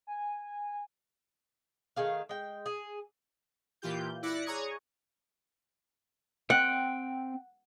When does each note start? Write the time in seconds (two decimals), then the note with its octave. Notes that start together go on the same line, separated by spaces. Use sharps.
0.07 G#5
1.96 D#3 A3 G#4 F5
2.29 G#3 G5
2.66 G#4
3.82 A#2 E3 F4 G4 G6
4.23 E4 D5 F#6 A#6 C#7
4.46 G#4 C#5 A#5 C#6 D#6 G#6
6.50 C4 F#5 G5